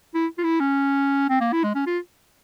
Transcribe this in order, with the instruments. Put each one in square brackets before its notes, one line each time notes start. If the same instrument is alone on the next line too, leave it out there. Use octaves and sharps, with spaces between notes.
[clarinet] E4
F4
E4
C#4
C4
A#3
E4
G#3
C#4
F4